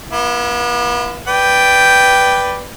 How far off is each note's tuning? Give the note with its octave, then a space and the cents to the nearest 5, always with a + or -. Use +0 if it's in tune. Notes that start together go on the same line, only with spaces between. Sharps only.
B3 -40 E4 +25
B4 +0 D5 +0 G5 +0